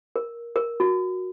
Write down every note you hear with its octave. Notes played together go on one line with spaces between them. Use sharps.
A#4
A#4
F#4